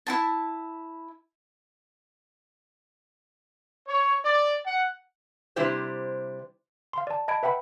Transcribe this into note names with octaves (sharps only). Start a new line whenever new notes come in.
E4 F4 A5
C#5
D5
F#5
C3 G3 D4 E4 G4 C5
F5 C6
D5 A5
D#5 A5 B5 G#6 D7
B4 E5 F#5 G5 B5